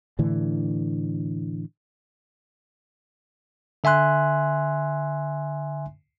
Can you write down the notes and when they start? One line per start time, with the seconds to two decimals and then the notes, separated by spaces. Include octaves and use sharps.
0.19 A2 D3 E3 D4
3.84 D3 E5 G#5 C6 F#6